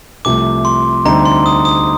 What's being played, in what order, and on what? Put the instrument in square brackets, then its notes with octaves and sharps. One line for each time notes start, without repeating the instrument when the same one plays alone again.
[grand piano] C2 C3 F3 A3 [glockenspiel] D6
[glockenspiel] C6
[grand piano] D2 D3 G3 C4 D#4 [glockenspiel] A#5
[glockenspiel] C6
D#6
D#6